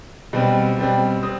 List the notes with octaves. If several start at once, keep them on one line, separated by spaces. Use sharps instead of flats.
B2 G3 C4
B2 G3 C4
C4 D#6